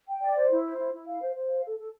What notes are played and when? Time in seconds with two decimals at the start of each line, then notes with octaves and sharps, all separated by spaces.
0.08 G5
0.22 D5
0.36 C5
0.51 E4
0.65 C5
0.79 E4
0.93 E4
1.07 F5
1.21 C5
1.35 C5
1.50 F5
1.65 A4
1.79 A4